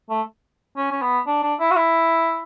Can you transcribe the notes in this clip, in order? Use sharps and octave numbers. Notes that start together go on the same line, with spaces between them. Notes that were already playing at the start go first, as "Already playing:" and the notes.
A3
C#4
C#4
B3
D4
D4
E4
F#4
E4